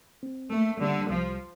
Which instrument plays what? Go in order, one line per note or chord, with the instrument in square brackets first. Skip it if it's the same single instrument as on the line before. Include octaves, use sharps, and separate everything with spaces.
[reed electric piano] C4
[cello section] A3 [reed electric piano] A#3
[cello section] D3 [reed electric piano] G3
[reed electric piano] C2 [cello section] F3